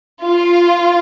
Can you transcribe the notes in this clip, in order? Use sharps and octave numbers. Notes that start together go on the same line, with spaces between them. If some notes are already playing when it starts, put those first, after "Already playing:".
F4